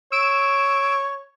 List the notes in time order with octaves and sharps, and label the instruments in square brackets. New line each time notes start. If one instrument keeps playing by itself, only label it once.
[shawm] C#5 [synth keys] E6 D7 E7